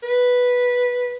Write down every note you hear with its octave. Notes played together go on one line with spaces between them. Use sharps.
B4